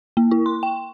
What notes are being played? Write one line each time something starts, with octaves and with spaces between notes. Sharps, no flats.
A#3
E4
C6
G5